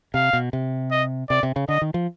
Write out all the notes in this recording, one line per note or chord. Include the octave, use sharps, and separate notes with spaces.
C3 F5
B2
C3
D#5
C3 D5
C3
C#3
D3 D#5
D#3
F3